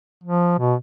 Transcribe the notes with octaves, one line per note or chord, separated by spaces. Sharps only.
F3
B2